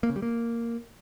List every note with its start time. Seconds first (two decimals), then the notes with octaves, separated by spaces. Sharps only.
0.03 A#3
0.10 C#3
0.16 G3
0.22 A#3